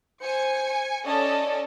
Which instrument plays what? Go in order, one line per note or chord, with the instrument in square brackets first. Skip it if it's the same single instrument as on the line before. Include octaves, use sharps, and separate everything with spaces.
[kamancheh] C5 [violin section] G#5 C#7
[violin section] C#4 A4 D#5 [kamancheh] D5 A5